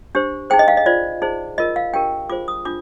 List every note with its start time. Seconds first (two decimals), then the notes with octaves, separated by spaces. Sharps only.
0.15 D4 G4 C5
0.50 D#4 G#4 C5 G5
0.59 D#5
0.68 F5
0.77 D#5
0.86 F4 C5 D5
1.22 D#4 G#4 C5
1.58 F4 A#4 D#5
1.76 F5
1.94 D4 G4 A#4 G5
2.30 F4 G#4 C5 D6
2.48 D#6
2.65 D4 F4 D6